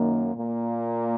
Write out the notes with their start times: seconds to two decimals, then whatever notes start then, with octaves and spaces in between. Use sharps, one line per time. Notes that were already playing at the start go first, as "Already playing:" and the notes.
Already playing: F#2 D#3 A#3
0.33 A#2 A#3